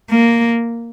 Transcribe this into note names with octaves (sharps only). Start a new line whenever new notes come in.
A#3